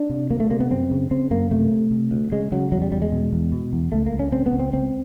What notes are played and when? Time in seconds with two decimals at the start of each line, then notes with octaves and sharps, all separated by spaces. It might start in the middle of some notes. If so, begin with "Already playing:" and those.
Already playing: D4
0.10 C3
0.30 D2 A#3
0.40 A3
0.50 C3 A#3
0.60 B3
0.71 F#2 C4
0.91 C#3
1.11 C#3 C4
1.31 F#2 A#3
1.51 C3 A3
1.71 C3
1.91 C3
2.11 D2
2.32 C#3 G#3
2.52 C#3 F#3
2.72 E2 F#3
2.82 G3
2.92 E2 G3
3.02 G#3
3.12 B2
3.33 E2
3.52 B2
3.73 E2
3.92 C#2 A3
4.06 A#3
4.13 C#2
4.19 C#4
4.32 C#3 C4
4.46 B3
4.53 C#2
4.60 C4
4.73 C#2 C4